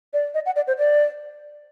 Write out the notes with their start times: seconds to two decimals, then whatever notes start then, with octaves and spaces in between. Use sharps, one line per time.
0.13 D5
0.34 D#5
0.46 F#5
0.56 D5
0.67 C5
0.78 D5